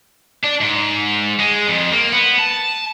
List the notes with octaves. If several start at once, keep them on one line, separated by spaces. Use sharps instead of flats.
D4
G#2
G#3
F2
A#3
B3
A5